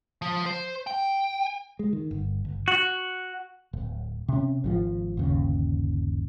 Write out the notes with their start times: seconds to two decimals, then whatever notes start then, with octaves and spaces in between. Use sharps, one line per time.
0.22 F3
0.46 C5
0.87 G5
1.79 G#3
1.93 D#3
2.11 G1
2.45 G1
2.68 F#4
3.73 D1
4.28 C3 C#4
4.64 G#1 E3 F3
5.17 G1 D#2 C#3